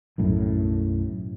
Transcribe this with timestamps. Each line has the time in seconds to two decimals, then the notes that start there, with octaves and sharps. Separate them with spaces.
0.18 B1 F#2 A2